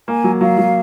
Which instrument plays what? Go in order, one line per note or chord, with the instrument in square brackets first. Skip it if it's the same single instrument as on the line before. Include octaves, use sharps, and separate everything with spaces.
[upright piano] A#3 [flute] G#5
[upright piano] F#3
[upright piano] F#3 [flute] F5
[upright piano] F#3